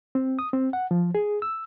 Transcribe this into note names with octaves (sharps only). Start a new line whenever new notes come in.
C4
D#6
C4
F#5
F3
G#4
E6